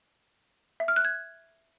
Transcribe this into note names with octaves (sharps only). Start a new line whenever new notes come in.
E5
F6
F#6
G#6